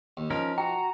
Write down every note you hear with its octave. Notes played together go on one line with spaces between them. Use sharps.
D#2
F3 C#4 D#4 A#4
F#4 G5 A#5